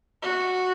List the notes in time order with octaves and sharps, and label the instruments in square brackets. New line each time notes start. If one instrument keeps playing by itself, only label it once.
[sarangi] F#4